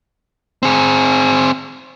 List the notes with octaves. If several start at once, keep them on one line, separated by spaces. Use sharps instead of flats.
C4 G#4